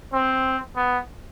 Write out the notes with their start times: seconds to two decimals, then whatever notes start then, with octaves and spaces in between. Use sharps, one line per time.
0.13 C4
0.76 B3